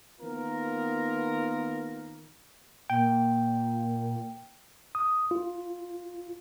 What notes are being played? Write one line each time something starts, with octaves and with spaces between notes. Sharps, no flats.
D#3 A#3 B3 F4 A#4
A#2 G5
D#6
F4